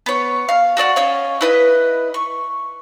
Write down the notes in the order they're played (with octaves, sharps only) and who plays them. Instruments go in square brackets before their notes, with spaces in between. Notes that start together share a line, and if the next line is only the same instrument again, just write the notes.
[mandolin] B3 C#5
F5
F#4 A4 D5 F#5
C#4 C#5 D#5 F5
E4 B4 D#5
C#6